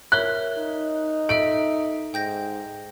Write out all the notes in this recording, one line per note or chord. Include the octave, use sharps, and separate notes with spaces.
A#4 C#5 E5 F#6
D#4
A4 D#5 E5 D7
G#2 G5 G6 A#6